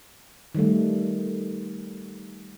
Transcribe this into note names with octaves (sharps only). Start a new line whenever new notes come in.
D#3 G3 A3